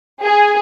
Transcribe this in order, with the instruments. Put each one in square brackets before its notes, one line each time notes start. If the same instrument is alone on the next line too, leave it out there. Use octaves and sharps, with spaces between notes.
[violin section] G#4